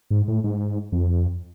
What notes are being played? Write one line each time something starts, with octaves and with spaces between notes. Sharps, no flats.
G#2
A2
G#2
F2